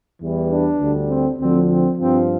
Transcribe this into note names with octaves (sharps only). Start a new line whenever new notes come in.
E2 E3 G3
D4
D2 D3 G3
C4
D2 D3 F3 C4
C4
G2 F3 C4